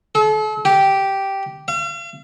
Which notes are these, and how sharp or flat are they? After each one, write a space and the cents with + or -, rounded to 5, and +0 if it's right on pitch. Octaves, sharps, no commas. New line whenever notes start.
A4 -40
G4 -5
F5 -45